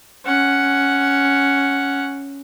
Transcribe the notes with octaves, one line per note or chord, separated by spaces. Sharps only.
C#4 F#5